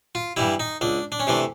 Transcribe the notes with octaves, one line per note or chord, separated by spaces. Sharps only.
F4
G2 E3 G3 E4
D#4
C#2 D4
D4
C#4
C3 E3 A3 D4